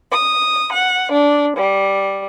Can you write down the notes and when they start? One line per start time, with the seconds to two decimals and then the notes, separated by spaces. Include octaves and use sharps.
0.11 D#6
0.71 F#5
1.11 D4
1.55 G3